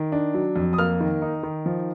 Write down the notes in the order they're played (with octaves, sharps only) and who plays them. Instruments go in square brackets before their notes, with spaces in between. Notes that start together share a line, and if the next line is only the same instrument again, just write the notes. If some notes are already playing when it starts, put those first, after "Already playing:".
Already playing: [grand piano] D#3
D4
F#3
F2
D#6
A#3 F6
D#3
D#4
D#3
F3